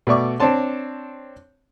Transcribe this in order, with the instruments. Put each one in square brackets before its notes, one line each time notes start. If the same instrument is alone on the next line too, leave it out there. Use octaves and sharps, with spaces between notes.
[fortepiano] B2 A3 D5 C#6 D6
C4 D4 C#5 A5 C6